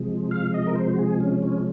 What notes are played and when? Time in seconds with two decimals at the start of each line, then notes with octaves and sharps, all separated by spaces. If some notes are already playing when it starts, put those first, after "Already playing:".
Already playing: C3 F3 G#3
0.31 F5
0.54 D#5
0.67 A#4
0.75 C5
0.93 F#4
0.98 G#4
1.20 C#4
1.42 C#4